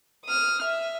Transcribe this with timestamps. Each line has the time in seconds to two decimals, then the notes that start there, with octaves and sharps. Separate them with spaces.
0.25 D#6 F6
0.63 E5